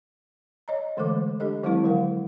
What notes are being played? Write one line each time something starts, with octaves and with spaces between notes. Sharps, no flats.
C#5 D#5 A#5
D3 E3 G#3 A3 A4 D6
D4 G4 A4 D#5
D#3 F#3 G#3 C4 E4 B4
D3 F3 A#4 F5 F#5